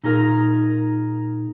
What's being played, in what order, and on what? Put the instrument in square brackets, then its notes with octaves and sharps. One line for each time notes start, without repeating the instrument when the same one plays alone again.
[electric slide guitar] A#2 D#4 G#4 A#4 F5